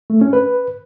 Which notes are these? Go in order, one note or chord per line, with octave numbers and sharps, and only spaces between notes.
A3
C#4
B4